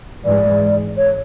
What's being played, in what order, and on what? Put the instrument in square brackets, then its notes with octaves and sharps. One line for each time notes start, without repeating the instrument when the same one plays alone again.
[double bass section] G#2 E3 G#3 [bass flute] D5
[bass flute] C#5